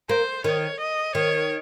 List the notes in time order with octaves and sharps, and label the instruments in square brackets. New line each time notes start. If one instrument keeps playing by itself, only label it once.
[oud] A#3 [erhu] C5
[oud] D#3 [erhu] C#5
[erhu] D#5
[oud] D#3 [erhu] C#5